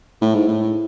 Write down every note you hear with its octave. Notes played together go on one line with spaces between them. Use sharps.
A2
G#2
A2